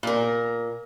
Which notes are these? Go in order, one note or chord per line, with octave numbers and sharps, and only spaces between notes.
A#2 A#4